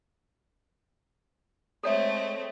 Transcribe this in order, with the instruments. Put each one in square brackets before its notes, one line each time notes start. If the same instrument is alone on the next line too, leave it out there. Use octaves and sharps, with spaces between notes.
[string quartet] G#3 A3 C4 [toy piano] A4 C#5 E5